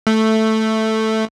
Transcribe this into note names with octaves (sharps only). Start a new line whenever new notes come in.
A3